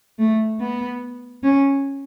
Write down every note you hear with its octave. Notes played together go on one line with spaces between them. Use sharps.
A3
B3
C#4